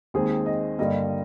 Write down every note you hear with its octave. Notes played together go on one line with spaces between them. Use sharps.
D#2 D#3 G#3 C4 G#4
D#5
G2 D3 G3 A#3 D#5